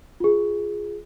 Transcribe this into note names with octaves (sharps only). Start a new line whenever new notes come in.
F4 G#4